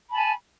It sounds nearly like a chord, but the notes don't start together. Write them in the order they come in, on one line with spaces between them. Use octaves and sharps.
B5 A5 G#5